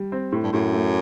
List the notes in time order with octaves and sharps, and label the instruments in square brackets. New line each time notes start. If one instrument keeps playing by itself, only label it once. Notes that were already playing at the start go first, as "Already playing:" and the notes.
Already playing: [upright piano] G3
C4
A2
[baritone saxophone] G2
[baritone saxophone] F#2 [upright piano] A2
[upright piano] A3